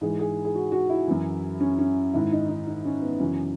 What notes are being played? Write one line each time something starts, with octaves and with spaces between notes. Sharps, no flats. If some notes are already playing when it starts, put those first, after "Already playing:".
G#2 E3 G#4
G#4
G#4
F#4
F#4
E4
F#2 E3
C#4
C#4
G#2 D#3 E4
D#4
D#4
D#4
C#4
B3
F#2 C#3 E3 C#4